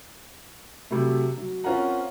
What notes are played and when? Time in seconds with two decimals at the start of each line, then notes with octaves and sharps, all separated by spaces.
0.91 C3 F#3 A3
1.38 F#3
1.64 C4 C#4 F4 A#4 F#5 A#5